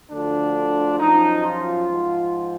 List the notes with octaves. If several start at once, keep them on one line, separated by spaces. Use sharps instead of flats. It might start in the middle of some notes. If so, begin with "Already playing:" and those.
D2 D3 F3 D4
F#2 F3 D#4
F4
G#2 F3